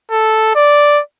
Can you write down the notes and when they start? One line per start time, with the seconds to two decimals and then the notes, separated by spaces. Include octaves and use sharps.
0.11 A4
0.55 D5